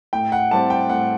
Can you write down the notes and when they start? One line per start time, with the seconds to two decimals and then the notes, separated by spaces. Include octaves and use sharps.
0.13 A2 G5
0.32 F#5
0.51 G3 C4 E4 A5
0.70 G5
0.89 A2 F#5